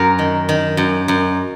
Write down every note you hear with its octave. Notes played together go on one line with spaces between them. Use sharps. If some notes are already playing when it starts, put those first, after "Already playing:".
Already playing: F#2 A#4
D#3
D#3
F#2
F#2